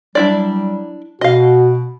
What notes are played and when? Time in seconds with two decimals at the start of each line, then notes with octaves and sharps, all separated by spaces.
0.15 F#3 G3 D4 E4 D5
1.21 B2 F#4 D#5 F5